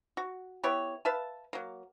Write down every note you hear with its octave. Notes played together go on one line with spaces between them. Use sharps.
F#4
B3 E4 G4 C#5
B4 E5 F5 A5
F#3 A#3